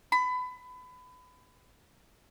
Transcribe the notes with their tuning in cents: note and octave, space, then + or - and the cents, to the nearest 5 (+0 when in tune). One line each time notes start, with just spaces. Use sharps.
B5 +25